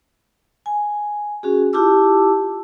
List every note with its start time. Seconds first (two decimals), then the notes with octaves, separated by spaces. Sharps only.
0.66 G#5
1.43 C#4 F#4 G#4
1.73 E4 F4 G4 A5 D6 E6